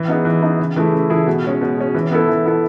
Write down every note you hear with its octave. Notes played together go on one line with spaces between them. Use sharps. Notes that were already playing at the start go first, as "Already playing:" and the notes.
Already playing: E3
B3 D#4 G#4
E3
B3 D#4 G#4
C#3
E3 A3 E4 G#4
C#3
E3 A3 E4 G#4
B2
G#3 C#4
B2
G#3 C#4
E3
B3 E4 A4
E3
B3 E4 A4